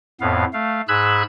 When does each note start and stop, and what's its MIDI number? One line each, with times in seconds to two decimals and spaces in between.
0.20 0.44 41
0.20 0.44 45
0.20 0.44 59
0.20 0.44 77
0.53 0.81 57
0.53 0.81 77
0.88 1.23 44
0.88 1.23 68
0.88 1.23 83
0.88 1.23 88
0.88 1.23 90
0.88 1.23 92